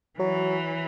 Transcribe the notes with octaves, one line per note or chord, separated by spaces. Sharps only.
E3 F#3